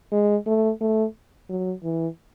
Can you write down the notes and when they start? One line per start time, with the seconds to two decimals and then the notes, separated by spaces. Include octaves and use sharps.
0.12 G#3
0.47 A3
0.81 A3
1.49 F#3
1.83 E3